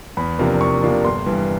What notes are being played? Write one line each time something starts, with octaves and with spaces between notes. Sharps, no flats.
E2 B5
C3 F3 A#3 D4
E2 C#6
C3 F3 A#3 D4
G1 C6
G2 E3